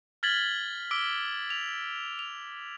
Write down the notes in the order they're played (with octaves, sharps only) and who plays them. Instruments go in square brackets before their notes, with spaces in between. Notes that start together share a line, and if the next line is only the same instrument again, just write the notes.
[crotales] F6 G#6 A6 B6 F#7 G7
D6 E6 B6 D7 G7
F7
F7